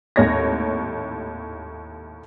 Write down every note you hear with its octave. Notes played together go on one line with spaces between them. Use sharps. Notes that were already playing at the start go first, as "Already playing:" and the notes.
G#1 D#2 A2 C#5 G#6 A#6